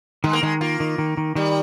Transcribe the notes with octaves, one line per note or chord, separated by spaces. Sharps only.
D#3 G#3
A#3
D#3 G#3
A#3 F4
D#3
D#3
D#3
D#3 G3